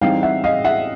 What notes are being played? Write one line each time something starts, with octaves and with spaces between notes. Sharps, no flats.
E3 G3 C4 D#4 F5 G5
E5 F#5
D#5 F5
E5 F#5